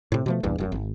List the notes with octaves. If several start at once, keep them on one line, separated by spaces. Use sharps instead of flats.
A2 C3
B2 F3 A3
A#1 E2 G2
F1 F#2
G#1